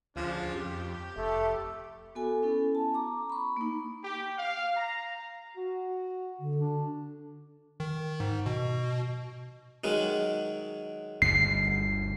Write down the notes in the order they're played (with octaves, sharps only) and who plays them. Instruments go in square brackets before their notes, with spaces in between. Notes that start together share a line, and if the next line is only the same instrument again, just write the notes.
[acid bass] D2 [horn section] C#3 F3 D4
[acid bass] F2 [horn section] G4
[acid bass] F1 [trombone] A3
[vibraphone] B3 F#4 A4 G#5
B3 C#4 E4 A4
A5
A#5 D6
B5 C#6
A#3 D#4
[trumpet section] G4
F5
A#5
[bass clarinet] F#4
[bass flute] D3
[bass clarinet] D4
[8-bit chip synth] D#3
G#2
B2
[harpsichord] D#3 F#3 G#3
[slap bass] G1 D2 G2 [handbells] C7